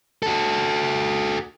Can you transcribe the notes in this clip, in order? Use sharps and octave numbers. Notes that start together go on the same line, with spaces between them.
F#4 A4